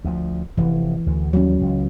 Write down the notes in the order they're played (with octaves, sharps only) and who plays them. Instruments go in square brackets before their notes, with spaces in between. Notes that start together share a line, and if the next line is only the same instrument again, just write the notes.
[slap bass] D2 F3
[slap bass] F1 [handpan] E3
[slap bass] D2
[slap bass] D#2 G3 [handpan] F#3 C#4
[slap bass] C#2